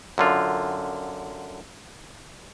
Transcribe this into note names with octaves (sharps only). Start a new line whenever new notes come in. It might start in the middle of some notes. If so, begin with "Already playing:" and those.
F#2 D3 F4